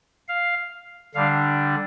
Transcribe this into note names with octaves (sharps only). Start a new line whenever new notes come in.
F5
D3 G3 D4 F5